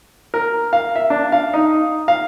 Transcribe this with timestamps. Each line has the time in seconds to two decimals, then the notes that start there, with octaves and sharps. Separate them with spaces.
0.34 A#4
0.73 F5
0.96 E5
1.10 D4
1.32 F5
1.54 D#4
2.08 F5